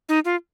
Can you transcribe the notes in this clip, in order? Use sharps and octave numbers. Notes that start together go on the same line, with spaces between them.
D#4
F4